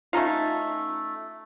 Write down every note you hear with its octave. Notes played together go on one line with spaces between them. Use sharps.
A3 C#4 D#4 F4